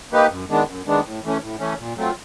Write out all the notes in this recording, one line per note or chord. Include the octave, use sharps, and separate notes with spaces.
A#3 D#4 G4 B4
F#2
D#3 G#3 B3 D4
F#2
D#3 G#3 B3 D4
A2
E3 A3 C#4
A2
E3 A3 C#4
A#2
F#3 A3 C4 F4